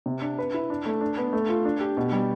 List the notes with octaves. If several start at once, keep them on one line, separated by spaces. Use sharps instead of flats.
C3
D4
B4
E4
D4
A3
D4
B3
A3
F4
D4
G4
B2
G3